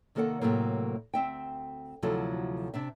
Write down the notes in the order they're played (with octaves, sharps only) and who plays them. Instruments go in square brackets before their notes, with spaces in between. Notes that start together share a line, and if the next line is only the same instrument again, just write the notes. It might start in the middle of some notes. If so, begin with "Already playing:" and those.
[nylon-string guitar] C3 D#3 A#3 A4 C#5 F#5
A2 C3 E3 F#3 A3 A#3
D2 C4 E5 G5
D2 C3 F3 F#3 E4 A4
C3 D4 E5